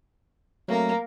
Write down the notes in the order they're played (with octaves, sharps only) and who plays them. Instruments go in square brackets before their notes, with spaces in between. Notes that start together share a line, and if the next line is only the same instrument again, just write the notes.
[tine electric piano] F#3 A3 C4 [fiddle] A#3 A#4